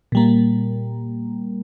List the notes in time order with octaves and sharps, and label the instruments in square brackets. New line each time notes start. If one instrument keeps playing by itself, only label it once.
[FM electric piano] A#2 G3 A#3